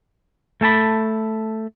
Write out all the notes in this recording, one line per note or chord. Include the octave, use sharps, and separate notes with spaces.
A3 A4 A5 B5